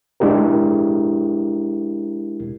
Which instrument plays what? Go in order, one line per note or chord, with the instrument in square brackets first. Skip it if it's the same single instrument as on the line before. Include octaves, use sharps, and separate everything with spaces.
[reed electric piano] G#3 D4 E4 G4 A#4